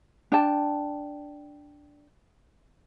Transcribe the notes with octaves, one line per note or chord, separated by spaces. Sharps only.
D4 G5 A5